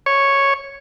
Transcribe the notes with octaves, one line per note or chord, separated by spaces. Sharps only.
C#5